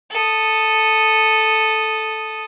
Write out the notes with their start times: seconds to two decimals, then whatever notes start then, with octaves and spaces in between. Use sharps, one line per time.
0.11 A4 D#6